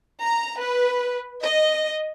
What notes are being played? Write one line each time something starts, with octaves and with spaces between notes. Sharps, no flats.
A#5
B4
D#5